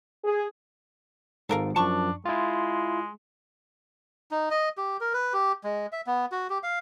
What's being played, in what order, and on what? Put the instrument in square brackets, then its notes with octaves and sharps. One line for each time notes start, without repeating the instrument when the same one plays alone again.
[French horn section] G#4
[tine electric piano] G#1 G#2 [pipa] A4 A#4 F5
[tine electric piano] F#2 F3 [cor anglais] D4 [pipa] A5 C#6
[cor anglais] G#3 [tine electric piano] E4 F4
[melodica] D#4
D#5
G4
A#4
B4
G4
G#3
E5
B3
F#4
G4
F5